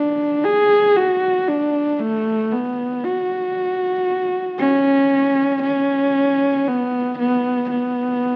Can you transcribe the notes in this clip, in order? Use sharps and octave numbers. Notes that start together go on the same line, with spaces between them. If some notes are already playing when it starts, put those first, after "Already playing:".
Already playing: D4
G#4
F#4
D4
A3
B3
F#4
C#4
C#4
B3
B3
B3